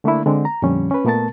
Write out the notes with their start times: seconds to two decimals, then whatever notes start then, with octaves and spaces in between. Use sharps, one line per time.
0.04 D3 A3 A#3 D4 E4
0.26 D3 G#3 C4
0.45 A#5
0.62 F2 A#2 D3 F3 G3 C#4
0.91 C#4 B4
1.05 A#2 A3 B3 A#4 A5 A6